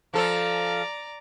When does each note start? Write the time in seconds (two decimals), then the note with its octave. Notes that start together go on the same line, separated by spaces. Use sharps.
0.14 F3 A4 D5 A#5